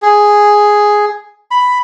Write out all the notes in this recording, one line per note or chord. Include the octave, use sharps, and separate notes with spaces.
G#4
B5